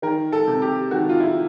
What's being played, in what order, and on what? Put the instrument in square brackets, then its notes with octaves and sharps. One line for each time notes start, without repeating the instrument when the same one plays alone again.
[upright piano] D#3 A#4
A4
C3
G4
D#3 F#4
F4
E4